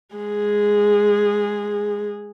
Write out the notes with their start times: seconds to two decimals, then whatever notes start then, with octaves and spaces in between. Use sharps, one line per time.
0.15 G#3 G#4